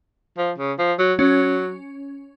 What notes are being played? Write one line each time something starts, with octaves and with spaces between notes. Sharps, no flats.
F3
C#3
F3
F#3
F#3 C#4